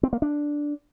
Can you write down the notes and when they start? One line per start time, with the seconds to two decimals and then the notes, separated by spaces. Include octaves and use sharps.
0.03 C4
0.13 A#3
0.22 D4